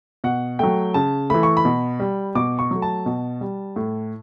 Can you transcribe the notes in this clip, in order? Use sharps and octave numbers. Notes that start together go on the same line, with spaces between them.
B2 F#5
F#3 A3 G5
C#3 A5
E3 A3 B5
C#6
B5
B2
G3
B2 D6
C#6
F#3 A3
A5
B2
G3
A2